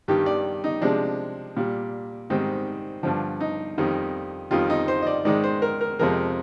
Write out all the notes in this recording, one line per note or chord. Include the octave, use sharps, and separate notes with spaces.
G2 D#3 G3 G4
D5
D#4
C3 F3 G#3 D4
A#2 G3
G#2 D#3 G3 C4
G2 D3 F3
D#4
F2 D#3 G3
F2 D#3 G3 F4
D#4
C5
D#5
D5
G#2 D#3 G#3 D5
C5
A#4
A#4
F2 C3 F3 G#3 A#4